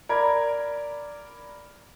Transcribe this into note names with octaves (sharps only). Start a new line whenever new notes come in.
A#4 D5 B5 G#6